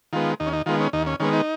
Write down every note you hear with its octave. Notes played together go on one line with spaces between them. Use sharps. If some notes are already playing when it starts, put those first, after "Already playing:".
D#3 G#3 B3 F4
D#2 D#4
C#4
D#4
D#3 G#3 B3 F4
C#4
D#2 D#4
C#4
D#3 G#3 B3 C#4
D#4